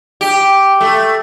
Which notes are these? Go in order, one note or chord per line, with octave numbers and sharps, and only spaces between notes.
G4
A3